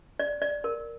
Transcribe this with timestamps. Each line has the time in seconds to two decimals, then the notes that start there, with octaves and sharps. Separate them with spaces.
0.19 D5
0.42 D5
0.64 A#4